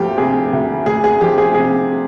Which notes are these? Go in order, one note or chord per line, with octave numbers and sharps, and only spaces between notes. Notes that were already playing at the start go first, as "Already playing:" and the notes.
Already playing: D2 F3 G4
C3 G#4
D2
D2 G#4
G#4
F3 G4
G#4
C3 G#4